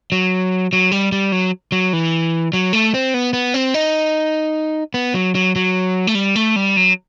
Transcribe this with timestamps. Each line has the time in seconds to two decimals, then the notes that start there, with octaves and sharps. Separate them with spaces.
0.12 F#3
0.73 F#3
0.92 G3
1.12 G3
1.32 F#3
1.72 F#3
1.93 E3
2.53 F#3
2.73 A3
2.94 C4
3.14 B3
3.33 B3
3.54 C4
3.74 D#4
4.94 B3
5.14 F#3
5.35 F#3
5.56 F#3
6.07 A3
6.15 G3
6.36 A3
6.56 G3
6.76 F#3